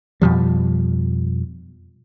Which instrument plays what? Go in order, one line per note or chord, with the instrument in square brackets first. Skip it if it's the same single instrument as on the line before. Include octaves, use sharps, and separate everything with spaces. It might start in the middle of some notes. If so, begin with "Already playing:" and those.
[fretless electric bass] F2 B2 F3 G3